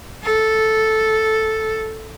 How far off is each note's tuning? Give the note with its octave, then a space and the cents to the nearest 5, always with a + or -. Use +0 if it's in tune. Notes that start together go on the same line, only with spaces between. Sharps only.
A4 -5